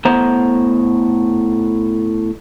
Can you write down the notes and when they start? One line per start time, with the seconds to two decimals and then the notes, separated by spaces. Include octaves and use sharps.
0.05 A2 B3 C5 A#5